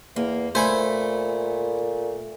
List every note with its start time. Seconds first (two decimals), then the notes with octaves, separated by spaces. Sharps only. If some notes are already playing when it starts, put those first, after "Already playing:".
0.16 E2 A#3
0.55 A#2 A3 C5 G#5 B5